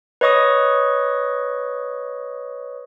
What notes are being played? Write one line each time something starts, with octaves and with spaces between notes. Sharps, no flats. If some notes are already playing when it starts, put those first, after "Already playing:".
B4 C#5 D#5 C#6 D#6